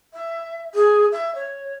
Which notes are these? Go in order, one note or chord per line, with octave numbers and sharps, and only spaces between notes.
E5
G#4
E5
C#5